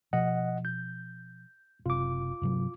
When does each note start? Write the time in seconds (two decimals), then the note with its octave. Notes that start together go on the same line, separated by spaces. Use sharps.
0.13 B2 F3 D#5 F#5
0.65 G6
1.86 F#1 C3 F4 D6
2.42 G2 C3 F#3